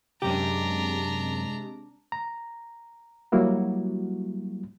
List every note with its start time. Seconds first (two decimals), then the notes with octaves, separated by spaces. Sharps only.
0.22 F#2 C3 G#3 D4 G4 A#5
2.12 A#5
3.32 F#3 G3 A#3 E4 F#4